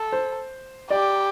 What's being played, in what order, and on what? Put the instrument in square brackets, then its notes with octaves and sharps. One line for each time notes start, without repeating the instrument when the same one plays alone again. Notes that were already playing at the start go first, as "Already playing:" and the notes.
Already playing: [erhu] A4
[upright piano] C5
[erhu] G4 [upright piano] D5